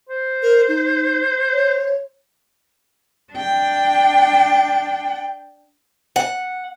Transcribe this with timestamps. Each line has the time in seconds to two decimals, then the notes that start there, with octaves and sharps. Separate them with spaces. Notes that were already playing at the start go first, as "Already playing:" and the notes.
0.09 C5
0.43 A#4
0.68 D#4
1.52 C#5
3.33 D4 G5
6.16 F#5